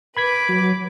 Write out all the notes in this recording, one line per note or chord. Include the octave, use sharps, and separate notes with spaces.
B4 B5 D6 G#6 B6
F#3